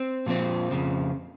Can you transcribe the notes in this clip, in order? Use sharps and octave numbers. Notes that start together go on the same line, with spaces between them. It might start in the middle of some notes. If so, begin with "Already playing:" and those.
Already playing: C4
A#2 F3 C4
F2 C#3 F3